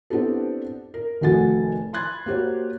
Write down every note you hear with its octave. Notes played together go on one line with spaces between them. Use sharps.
B3 C4 D4 E4 G4 A4
A#4
F1 D#2 A3 F#4 G#5 A6
B5 C6 F#6 G#6 A6
A#3 F#4 G4 C5 C#5